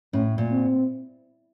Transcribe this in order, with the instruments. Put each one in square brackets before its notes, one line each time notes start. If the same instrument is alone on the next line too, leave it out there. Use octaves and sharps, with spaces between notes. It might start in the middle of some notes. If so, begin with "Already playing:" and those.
[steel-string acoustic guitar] A2 [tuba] C#4
[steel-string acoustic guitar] A#2
[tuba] C4